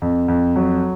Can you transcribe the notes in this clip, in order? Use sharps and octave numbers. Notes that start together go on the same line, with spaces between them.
F2
F2
F#3